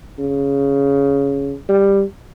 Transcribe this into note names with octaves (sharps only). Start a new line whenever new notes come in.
C#3
G3